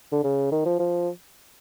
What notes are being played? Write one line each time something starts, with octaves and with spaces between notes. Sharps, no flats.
D3
C#3
D#3
F3
F3